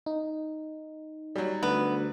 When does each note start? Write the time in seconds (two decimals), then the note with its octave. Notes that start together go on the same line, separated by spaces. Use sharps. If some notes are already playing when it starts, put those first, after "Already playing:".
0.06 D#4
1.36 F#3 G3
1.63 D2 B3